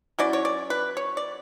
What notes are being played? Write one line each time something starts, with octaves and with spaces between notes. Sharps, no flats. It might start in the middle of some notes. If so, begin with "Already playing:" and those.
F#3 C#4 E4 D5
C#5
D5
B4
C#5
D5